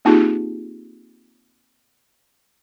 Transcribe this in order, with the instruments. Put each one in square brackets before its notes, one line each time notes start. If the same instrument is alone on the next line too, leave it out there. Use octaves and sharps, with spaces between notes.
[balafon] A#3 C4 D#4 F4 G4 G#4